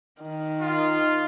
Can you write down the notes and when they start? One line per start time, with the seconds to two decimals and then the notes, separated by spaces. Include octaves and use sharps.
0.22 D#3
0.62 F4